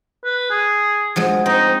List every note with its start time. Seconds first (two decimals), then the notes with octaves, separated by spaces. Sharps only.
0.25 B4
0.51 G#4
1.16 F3 F#3 G#3
1.46 C4 D#4